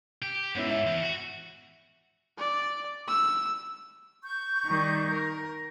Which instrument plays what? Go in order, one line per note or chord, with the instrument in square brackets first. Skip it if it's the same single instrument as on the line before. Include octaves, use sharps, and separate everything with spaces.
[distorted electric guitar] G4
[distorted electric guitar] G#2 [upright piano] B3 C#4 E4
[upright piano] E5
[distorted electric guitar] E2
F#4
[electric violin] D5
E6
[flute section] C#6 G6
[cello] D#3 G3
A#4